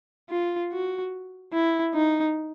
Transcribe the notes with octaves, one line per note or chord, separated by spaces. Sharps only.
F4
F#4
E4
D#4